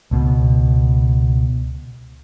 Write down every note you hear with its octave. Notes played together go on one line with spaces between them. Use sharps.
C#2 B2